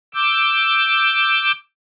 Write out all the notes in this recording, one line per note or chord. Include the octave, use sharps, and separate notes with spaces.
D6 E6 G6